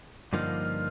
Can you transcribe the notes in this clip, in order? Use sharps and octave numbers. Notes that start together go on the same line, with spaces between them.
G2 D3 F3 A#3 D#4 F6